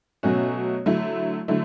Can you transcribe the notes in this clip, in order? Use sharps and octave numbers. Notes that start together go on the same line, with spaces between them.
B2 F#3 A3 C#4 F#4
D3 F#3 A3 E4
D3 F#3 A3 E4